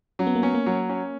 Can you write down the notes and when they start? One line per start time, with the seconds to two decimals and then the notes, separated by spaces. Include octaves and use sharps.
0.19 F#3 C#4
0.27 B3
0.35 A#3
0.42 B3 C#4
0.54 A#3
0.66 F#3
0.89 C#4